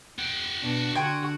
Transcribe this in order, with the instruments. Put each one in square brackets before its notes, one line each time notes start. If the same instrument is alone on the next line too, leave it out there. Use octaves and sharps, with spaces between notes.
[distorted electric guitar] F#4 G5
[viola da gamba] B2 D4
[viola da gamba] D3 F#4 [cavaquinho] G5 G#5 C6